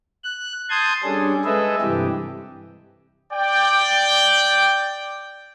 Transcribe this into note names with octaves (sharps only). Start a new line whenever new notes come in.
F#6
A5 C6 D#6 G6 G#6
G3 C#4 D4 G#4 A4
G#3 G#4 A4 B4 D#5 E5
G2 C3 E3 G4
D5 G5